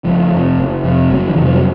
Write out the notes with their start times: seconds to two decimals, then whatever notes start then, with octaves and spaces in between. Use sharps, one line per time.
0.05 F#1 F3
0.32 F2 C3
0.58 F#1
0.84 F2 C3
1.10 F#1 F#3
1.28 D#3
1.36 F2 C3 E3
1.45 F3
1.54 F#3